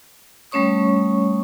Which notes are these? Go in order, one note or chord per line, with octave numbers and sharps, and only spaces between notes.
G3 A3 C#4 C#5 C#6 D#6